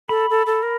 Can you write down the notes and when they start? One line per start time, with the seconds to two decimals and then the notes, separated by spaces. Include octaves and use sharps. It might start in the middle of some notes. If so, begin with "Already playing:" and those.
0.09 A4 B5
0.30 A4
0.46 A4
0.63 A#4